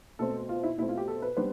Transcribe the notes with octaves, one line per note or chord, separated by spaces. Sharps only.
B2 A3 C4 A4
F4
E4
B2 A3 C4 E4
F4
G4
A4
B4
G3 B3 D4 C5